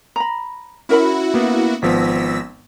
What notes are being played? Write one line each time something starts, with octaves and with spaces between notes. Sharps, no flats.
A#5 B5
C#4 E4 F#4 A#4 B5
A#3 B3
G#1 F3 B3 E6 A#6 B6